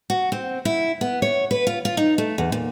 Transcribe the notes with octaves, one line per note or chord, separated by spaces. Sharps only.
F#4
C4
E4
B3
C#5
B4
F4
F4
D#4
A3
E2
A#2